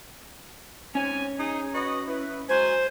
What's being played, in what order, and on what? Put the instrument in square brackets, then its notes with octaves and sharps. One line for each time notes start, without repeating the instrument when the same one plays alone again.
[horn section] G#2 C4 G#5 [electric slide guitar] C#4 C#5
[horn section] D#4 G#4
F#4 B4 D#5
E4 B4
[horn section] F#3 G#3 G#5 [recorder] C5